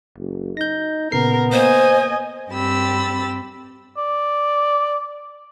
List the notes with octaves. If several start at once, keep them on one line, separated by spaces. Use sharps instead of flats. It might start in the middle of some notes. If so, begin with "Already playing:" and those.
F#1
D#4 G6 A#6
A#2 C#3 B3 A#4 C7
A#3 C5 D#5 G#5
G2 C4 G4 B5 E6 A6
D5